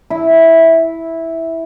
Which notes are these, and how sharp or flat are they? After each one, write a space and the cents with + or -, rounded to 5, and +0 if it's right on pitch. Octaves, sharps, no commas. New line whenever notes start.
E4 -10